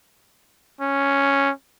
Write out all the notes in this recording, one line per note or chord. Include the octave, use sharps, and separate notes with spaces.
C#4